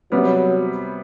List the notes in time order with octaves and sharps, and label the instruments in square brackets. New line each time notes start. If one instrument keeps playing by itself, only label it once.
[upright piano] C3 G3 B3 [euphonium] F#3